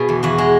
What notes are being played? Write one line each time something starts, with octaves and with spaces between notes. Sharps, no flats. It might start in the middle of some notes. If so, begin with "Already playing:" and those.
Already playing: B2 G#4
E2
E2 F#4
G#3